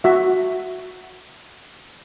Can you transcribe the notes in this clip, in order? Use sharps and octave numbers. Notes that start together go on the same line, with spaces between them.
F#4 E5